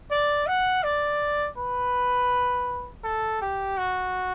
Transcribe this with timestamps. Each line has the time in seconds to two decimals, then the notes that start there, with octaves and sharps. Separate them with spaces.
0.11 D5
0.47 F#5
0.83 D5
1.57 B4
3.04 A4
3.42 G4
3.78 F#4